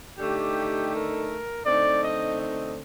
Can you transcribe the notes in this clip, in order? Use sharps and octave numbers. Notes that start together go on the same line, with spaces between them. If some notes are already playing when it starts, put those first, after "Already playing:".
D3 A3 D#4 G4
A#4
D3 A3 C4 D#4 D5
D#5
D#5